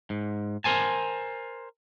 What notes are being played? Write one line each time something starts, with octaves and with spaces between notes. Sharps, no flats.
G#2
A#4 C5 G#5 A5